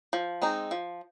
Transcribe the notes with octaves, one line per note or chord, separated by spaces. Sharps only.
F3
G#3 C4 D#4
F3